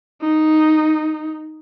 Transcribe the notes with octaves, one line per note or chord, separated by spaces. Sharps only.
D#4